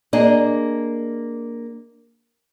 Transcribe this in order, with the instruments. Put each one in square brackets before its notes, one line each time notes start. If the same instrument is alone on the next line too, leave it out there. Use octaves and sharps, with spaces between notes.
[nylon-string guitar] A#3 D4 G#4 D#5